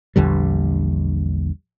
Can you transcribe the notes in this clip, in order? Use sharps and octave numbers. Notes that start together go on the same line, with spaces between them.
A#1 E2 D3 G3